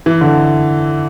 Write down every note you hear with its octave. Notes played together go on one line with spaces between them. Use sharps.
E3
D3